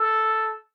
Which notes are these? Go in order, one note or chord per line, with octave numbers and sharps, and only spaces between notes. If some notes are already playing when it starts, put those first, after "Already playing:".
Already playing: A4